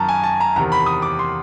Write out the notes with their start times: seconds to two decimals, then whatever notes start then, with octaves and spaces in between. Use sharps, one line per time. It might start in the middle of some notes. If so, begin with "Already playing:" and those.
Already playing: F#2 D#3 A5 A#5
0.09 G#5
0.23 A5
0.40 A#5
0.56 E2 C3 D#3 A#5
0.72 B5
0.86 D#6
1.02 D6
1.19 C6